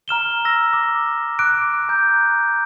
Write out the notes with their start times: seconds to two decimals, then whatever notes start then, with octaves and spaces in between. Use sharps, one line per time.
0.08 A#5 F6 E7 G7
0.45 E6 A#6
0.73 D6
1.39 D6 F#6 D7
1.89 A#5 G6